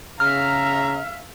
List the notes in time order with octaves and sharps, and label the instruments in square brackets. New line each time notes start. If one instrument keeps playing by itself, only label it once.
[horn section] C#3 A#5 [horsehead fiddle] E5 F5 [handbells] F6